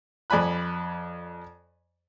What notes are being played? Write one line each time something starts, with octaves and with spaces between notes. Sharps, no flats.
F2 D5 G#5 B5 F#6